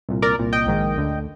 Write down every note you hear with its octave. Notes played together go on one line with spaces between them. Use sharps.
C2 A#2
A#4 D5
C2 A#2
D#5 G5
A#1 G#2 D#3
D2 D3